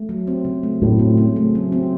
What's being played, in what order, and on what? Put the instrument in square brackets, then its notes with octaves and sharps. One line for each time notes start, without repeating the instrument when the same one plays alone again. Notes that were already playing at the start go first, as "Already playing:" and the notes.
Already playing: [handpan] A3
F#3
C4
C#3
A3
[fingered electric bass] A2 [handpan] F#3
[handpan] C4
C#3
A3
F#3
C4